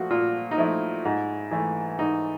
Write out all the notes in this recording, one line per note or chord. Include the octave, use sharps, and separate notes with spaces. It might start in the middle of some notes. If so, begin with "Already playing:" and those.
Already playing: A#2 F3 A3 F#4
A#2 F4
D#4
F3 A3 E4
G#2
E3 A3
G#2 D#4